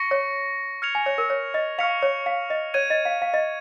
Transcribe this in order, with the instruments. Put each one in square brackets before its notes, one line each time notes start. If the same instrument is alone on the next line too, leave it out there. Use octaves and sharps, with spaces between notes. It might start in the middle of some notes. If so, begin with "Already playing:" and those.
Already playing: [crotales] C#6 A#6 C#7
[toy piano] C#5
[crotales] F6 G#6 C#7 F7
[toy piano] G#5
C#5
A#4
C#5
D#5
[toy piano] F5 [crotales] C#6 F6 C#7 F7
[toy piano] C#5
F5
D#5
[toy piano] C#5 [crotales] G#6 D#7
[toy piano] D#5
F5
F5
D#5